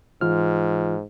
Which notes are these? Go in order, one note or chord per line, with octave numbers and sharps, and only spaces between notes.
G#2 E3 F4 F6